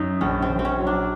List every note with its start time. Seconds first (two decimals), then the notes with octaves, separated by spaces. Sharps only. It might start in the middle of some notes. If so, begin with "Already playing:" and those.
Already playing: F#2 D#4
0.21 A#1 C#4
0.42 C4
0.50 A#1
0.59 C4
0.65 C#4
0.79 F#3
0.87 D4